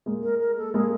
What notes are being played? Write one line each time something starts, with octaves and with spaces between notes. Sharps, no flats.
G#3 A#3
A#4
A#4
A4
G#3 A#3 G#4